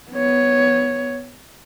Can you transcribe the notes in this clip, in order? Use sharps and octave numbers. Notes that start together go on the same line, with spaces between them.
B3 C#5